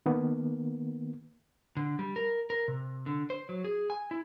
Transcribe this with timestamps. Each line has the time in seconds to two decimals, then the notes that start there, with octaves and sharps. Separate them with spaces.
0.06 D#3 A#3 B3
1.77 D3
1.99 G3
2.16 A#4
2.50 A#4
2.68 C3
3.06 D3
3.30 C5
3.49 F#3
3.64 G#4
3.90 G#5
4.11 E4